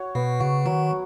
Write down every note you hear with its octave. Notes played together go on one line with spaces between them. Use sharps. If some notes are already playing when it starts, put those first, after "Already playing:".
Already playing: F#4 C#5
B2 B3
C#3 F#4
D#3 F#3